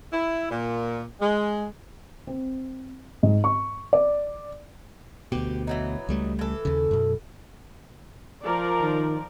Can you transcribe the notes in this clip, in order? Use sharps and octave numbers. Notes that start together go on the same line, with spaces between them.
E4
A#2
G#3
C4
G#2
C#6
D5
D2 B2 G4
E3 F#3 D#4
C#2 G3 A3
E3 A4
D#2 C#3
F#2 B2
F3 A#4 D5
D#3